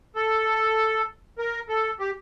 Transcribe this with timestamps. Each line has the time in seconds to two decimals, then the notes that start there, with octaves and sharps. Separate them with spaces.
0.16 A4
1.38 A#4
1.69 A4
2.00 G4